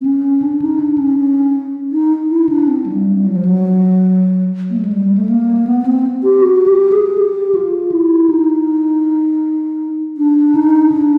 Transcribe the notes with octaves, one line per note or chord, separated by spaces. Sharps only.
C4
C#4
D4
D#4
D4
C#4
C#4
D#4
E4
D4
C4
F#3
G3
G3
F#3
F3
F#3
A#3
A3
G#3
G3
A3
A#3
B3
B3
C4
G4
F#4
G4
G#4
G4
F4
E4
D#4
D4
D#4
D4